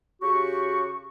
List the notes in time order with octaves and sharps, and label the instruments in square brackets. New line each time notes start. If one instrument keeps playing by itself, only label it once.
[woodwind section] C#3 F#4 G4 C#6